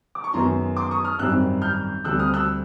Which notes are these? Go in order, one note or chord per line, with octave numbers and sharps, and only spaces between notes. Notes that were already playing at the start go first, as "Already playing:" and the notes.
D6
C#6
F#2 D#3 G#3 B3 A#5 C6
C6 D6
C#6 D#6
D#6 F6
G#1 F#2 D#3 G3 C4 E6 F#6
F6 G6
D2 D3 G3 C4 E6 F#6
D#6 F6
E6 F#6